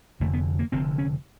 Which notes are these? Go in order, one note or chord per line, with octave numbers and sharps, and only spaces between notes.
F1 F2 D3 A3
B3
A#3
F1 F2 D3 C4
C#4